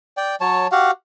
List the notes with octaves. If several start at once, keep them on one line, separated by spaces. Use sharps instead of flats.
D5 G5
F#3 C#5 A5
F#4 G4 F5 F#5